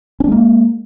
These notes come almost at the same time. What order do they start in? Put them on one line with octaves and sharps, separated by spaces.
C#4 D4 G#3 A#3